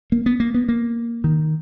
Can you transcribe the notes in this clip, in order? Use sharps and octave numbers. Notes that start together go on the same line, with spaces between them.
A#3
B3
A#3
B3
A#3
D#3